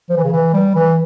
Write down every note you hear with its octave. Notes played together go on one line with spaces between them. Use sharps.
F3
E3
C#3
E3
G3
E3